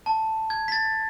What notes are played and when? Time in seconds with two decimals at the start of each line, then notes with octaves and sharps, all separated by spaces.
0.06 A5
0.50 G#6
0.68 B6
0.72 A6